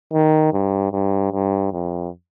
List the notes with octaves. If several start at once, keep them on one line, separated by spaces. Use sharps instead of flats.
D#3
G2
G2
G2
F2